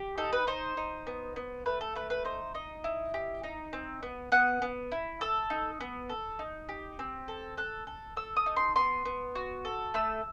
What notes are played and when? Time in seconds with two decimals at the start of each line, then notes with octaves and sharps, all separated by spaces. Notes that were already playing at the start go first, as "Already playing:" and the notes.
Already playing: G4
0.18 D#4 A4
0.33 B4
0.47 D#4 C5
0.77 D#4
1.07 B3
1.36 B3
1.66 A3 B4
1.81 A4
1.96 A3 B4
2.10 B4
2.25 D#4 C5
2.54 D#4 D#5
2.84 E4
3.14 G4
3.43 D#4
3.73 C4
4.03 B3
4.32 B3 F#5
4.62 B3
4.92 E4
5.21 A4 E6
5.50 D#4
5.81 B3
6.09 A4
6.39 D#4
6.69 G4
6.99 C4
7.28 A4
7.57 A4 F#6
7.87 A4
8.16 A4 E6
8.37 D#6
8.46 D#4
8.56 C6
8.76 B3 C6
9.05 B3
9.35 F#4
9.65 A4
9.94 A3 E6